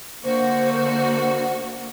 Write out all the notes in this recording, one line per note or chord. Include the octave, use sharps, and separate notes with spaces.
D3 A#3 F#4 C5